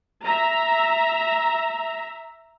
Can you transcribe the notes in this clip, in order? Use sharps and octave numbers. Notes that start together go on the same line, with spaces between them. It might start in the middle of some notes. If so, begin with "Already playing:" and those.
E5 A#5